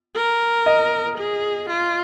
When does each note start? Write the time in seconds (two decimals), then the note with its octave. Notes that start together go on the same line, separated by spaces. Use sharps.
0.16 A#4
0.66 D#5
1.18 G#4
1.70 F4